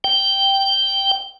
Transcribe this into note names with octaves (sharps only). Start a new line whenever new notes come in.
G5